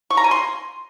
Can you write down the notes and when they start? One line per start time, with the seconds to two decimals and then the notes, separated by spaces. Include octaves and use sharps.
0.10 C#6
0.17 A#5
0.24 G#5
0.31 C6